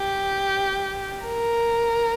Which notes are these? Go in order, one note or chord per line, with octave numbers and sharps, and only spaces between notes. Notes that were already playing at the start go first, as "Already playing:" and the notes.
Already playing: G4
A#4